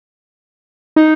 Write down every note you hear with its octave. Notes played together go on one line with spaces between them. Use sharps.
D#4